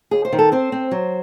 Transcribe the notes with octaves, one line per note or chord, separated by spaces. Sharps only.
D#2 G#4
C5
D#3
A4
C4 C5
C4
F#3